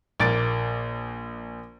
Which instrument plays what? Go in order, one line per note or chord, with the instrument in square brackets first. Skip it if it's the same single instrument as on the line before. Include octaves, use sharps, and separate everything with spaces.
[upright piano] A#1 A#3 A6 D7